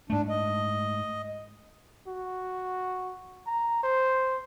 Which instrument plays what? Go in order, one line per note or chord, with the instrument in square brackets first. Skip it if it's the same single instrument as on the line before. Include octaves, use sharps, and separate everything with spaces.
[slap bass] G#2 A3 [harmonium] D4
[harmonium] D#5
[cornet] F#4
A#5
C5